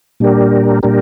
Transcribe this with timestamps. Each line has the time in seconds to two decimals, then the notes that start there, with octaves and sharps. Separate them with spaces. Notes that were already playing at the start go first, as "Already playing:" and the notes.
0.20 A#2 G3 D4 G4 A#4
0.83 A#2 G3 D4 G4 A#4